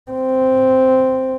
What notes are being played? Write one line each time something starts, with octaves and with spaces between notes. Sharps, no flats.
C4